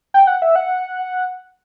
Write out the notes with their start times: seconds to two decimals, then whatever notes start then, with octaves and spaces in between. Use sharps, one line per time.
0.14 G5
0.27 F#5
0.42 E5
0.56 F#5